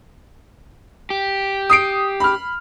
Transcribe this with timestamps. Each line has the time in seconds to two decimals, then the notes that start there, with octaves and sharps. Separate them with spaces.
1.10 G4
1.70 D#6 C7 D7
2.20 B5 F6